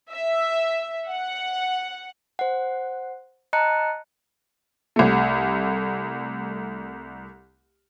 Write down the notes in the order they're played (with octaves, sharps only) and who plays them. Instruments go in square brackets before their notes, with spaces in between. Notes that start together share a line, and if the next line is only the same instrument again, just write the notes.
[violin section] E5
F#5
[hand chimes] C5 F#5
D#5 A5 A#5 F#6 C#7
[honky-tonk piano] C2 A3